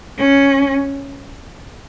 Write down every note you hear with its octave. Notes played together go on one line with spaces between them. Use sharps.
C#4